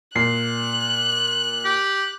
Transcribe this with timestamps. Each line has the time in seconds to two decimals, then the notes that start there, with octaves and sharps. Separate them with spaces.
0.16 A#2 F#6 C7
1.65 G4